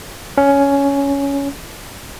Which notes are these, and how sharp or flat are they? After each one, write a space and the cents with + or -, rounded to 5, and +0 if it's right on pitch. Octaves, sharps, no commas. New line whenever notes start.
C#4 +10